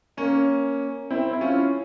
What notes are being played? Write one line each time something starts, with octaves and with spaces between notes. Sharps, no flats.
A#3 C#4
C4 E4
E4
C#4 F4